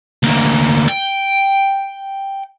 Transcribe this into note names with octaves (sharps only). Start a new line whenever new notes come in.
D2 A#3
G5